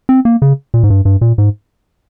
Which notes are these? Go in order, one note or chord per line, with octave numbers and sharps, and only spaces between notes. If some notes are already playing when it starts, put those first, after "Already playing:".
C4
A#3
C#3
A#2
G#2
G2
G2
A#2
G#2